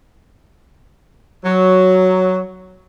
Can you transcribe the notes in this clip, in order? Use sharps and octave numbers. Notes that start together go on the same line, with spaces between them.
F#3